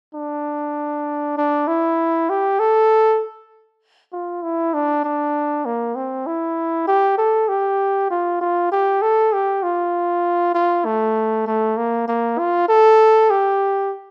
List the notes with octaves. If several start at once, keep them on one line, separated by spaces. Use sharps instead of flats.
D4
D4
E4
G4
A4
F4
E4
D4
D4
A#3
C4
E4
G4
A4
G4
F4
F4
G4
A4
G4
F4
F4
A3
A3
A#3
A#3
F4
A4
G4